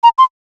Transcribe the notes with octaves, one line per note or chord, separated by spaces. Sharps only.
A#5
C6